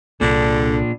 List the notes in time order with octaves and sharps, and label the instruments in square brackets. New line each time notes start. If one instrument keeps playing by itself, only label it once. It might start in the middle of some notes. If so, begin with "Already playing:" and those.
[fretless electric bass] C2 [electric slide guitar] A#2 D4 [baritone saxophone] D3